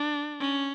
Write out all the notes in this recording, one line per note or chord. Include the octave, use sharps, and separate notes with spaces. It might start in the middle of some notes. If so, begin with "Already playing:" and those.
Already playing: D4
C#4